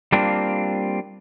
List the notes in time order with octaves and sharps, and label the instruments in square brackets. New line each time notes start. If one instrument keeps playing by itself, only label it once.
[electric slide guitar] G3 A#3 C4 D4 F4